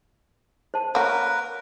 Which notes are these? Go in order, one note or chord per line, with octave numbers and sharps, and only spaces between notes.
C5 A5
A#3 F#4 A#4 B4 C#5